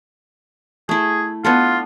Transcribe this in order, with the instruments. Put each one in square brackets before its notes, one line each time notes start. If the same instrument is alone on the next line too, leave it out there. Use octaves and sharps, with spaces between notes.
[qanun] A3 E4 [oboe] G#4
[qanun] B3 D4 A4 [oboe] F4